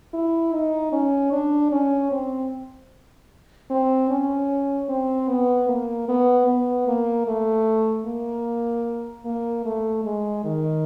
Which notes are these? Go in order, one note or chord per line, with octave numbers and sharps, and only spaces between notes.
E4
D#4
C#4
D4
C#4
C4
C4
C#4
C4
B3
A#3
B3
B3
A#3
A3
A#3
A#3
A3
G#3
D#3